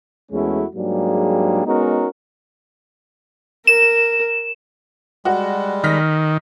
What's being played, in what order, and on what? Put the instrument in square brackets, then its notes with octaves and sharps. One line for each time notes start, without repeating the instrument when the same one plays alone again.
[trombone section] E2 G#3 A3 C#4 E4 F#4
G#2 F#3 G3 A#3 D4 G#4
G#3 B3 C#4 D#4 F#4 A#4
[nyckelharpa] A#4 [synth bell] E7
[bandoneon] G3 G#3 [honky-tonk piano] F#4
[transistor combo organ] D#3 [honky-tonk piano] F6 A#6 B6